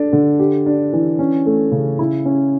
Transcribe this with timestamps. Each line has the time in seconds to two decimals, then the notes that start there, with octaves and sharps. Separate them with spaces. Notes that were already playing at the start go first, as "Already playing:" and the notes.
Already playing: D4 A4
0.13 D3
0.39 G4
0.66 D4
0.93 E3
1.19 C#4
1.46 A3
1.72 C#3
1.99 E4
2.25 C#4